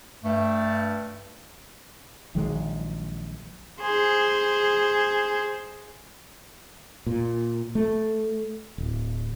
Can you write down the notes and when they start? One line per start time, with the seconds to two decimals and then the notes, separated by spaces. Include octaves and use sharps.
0.24 G2 A3
2.35 A#1 D#3 F#3 G#3
3.81 G#4 C5
7.06 A#2
7.75 A3
8.78 D1